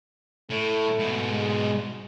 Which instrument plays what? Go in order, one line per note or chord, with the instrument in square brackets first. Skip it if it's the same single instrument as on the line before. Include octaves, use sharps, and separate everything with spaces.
[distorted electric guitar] A2 [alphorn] A3
[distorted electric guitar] G#2 B2
[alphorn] G#3